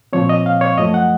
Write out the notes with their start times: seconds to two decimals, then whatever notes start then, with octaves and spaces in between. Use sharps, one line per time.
0.13 A#2 F3 C4 C#5
0.29 D#5
0.46 F5
0.61 C#5
0.77 F#2 F3 A3 D#5
0.94 F#5